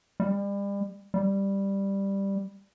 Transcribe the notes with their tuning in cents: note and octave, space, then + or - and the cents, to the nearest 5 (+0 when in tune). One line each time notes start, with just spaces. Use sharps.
G3 +35
G3 +5